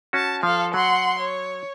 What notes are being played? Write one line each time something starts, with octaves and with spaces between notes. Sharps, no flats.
C#4 F#4 A5
F3 A4 F5
F#3 F#5 C6
C#5